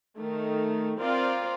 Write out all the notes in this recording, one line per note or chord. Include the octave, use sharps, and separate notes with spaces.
D#3 A3
C4 F4 A#4 D5 F5